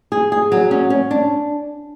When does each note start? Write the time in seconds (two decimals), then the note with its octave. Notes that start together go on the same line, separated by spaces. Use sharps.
0.12 G#4
0.32 G#4
0.52 F#3
0.71 C#4
0.90 C#4
1.11 D4